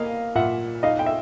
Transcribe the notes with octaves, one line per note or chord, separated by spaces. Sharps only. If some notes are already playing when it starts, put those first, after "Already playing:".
Already playing: A#3 D#5 F5
A#2 E5 F#5
D#4 D#5 F5
G5
E5